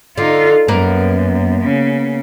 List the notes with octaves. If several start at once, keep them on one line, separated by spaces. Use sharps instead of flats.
D3 D#4 F4
F#2 A#3 B3 A#4
C#3